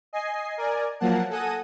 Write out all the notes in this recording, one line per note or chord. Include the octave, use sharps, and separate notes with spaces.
D#5 G#5 C7
A#4 D5 G#5
F3 F#3 A#3 F#5 A5
A4 F#5 G#5 D#6 A#6 D#7